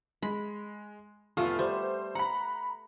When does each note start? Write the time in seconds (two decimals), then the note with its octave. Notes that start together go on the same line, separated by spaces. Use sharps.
0.23 G#3 B5
1.37 F1 A3 B3 F4
1.59 G3 C5
2.15 F#5 A#5 B5